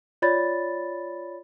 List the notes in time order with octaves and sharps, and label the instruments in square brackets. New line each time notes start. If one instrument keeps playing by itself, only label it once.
[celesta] F4 C#5 D5 B5 A6